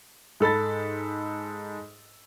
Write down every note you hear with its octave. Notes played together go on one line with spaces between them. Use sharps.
G#2 A4 B5 A6